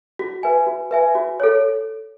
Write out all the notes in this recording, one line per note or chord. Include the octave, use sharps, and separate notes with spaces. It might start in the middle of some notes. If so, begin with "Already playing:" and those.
F#4
B4 E5 G#5
F#4
B4 E5 G#5
F#4
A4 C#5